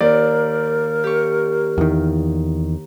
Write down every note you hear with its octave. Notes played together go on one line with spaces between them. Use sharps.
D#2 A#4 D5
G4 C#6
E2 D#3